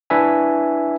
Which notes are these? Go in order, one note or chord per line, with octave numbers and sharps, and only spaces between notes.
D4 E4 B4 E5 G#5